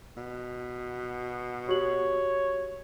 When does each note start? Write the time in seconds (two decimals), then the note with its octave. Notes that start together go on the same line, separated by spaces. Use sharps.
0.17 B2
1.69 F#4 G4 C#5 F#7